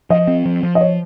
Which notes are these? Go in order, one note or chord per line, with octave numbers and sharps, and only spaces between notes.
F3 D#5
C4
F3
F3
D#5
C#5